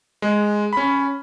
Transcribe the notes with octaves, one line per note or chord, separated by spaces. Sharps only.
G#3
C#4 B5